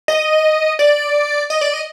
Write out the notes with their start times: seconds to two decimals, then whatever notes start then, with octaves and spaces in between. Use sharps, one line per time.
0.08 D#5
0.79 D5
1.50 D#5
1.61 D5
1.74 D#5